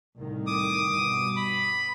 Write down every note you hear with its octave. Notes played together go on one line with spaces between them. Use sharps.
C2 A2 D#3
D6 D#6
G2 B2
B5